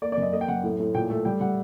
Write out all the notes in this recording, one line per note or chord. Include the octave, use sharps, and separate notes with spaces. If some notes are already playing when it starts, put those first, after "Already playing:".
A#3 D5
D5
F#2 D#5
A#3 D#5
G5
F#2 F#5
A2
A2
A#2 G5
A3
G3 G5
G3 F#5